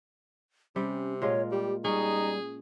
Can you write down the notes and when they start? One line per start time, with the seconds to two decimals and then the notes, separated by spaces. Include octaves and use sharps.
0.76 C3 G3 C#4
1.22 A#2 G#3 F4 C#5
1.51 G3 G4
1.84 G3 C#4 D#4 G#4